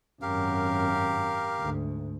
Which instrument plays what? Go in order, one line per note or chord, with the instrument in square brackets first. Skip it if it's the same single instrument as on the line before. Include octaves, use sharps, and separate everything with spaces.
[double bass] G#1 F#2 [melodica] G4 A#4 F5
[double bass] D2 G#2